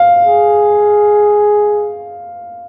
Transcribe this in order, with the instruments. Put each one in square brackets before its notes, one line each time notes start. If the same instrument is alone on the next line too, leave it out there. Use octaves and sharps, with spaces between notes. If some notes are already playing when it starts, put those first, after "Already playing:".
Already playing: [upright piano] F5
[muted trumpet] G#4